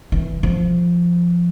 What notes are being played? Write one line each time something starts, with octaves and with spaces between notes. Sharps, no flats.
E3
F3